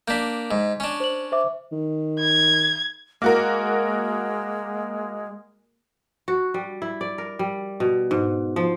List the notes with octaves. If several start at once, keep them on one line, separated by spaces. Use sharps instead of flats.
A#3 D4 G6 B6
G#2
C#4 D4
C5 F#7
C5 E5 D6
D#3
G#6
G#3 A#3 F#4 A#4
F#4
G3
E4
D5
A#4
G3
B2
G#2
F3